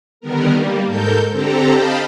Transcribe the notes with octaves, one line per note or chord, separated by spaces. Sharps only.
D3 D#3 G3 B3 A#4
G3 A#3
G#2 A4 A#4 G6
D3 C4 G4 A4 A#5
D#5 F5 G5 A5 B5